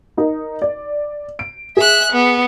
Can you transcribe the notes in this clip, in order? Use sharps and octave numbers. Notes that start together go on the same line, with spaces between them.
D#4 A#4
D5
D7
G#4 E5 F#6
B3